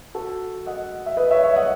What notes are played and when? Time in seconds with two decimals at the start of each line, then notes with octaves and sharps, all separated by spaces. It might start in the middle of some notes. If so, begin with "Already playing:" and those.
0.15 F#4 A4
0.66 D#5 F#5
1.06 E5
1.17 B4 D#5
1.31 C#5 E5
1.43 C#5 E5
1.56 D#5 F#5